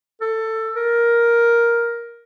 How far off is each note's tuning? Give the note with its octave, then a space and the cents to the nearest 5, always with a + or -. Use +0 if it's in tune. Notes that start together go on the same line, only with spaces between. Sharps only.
A4 +20
A#4 +10